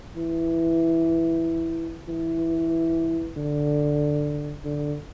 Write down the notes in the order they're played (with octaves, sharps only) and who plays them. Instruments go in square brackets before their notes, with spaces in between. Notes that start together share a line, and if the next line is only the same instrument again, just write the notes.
[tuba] E3
E3
D3
D3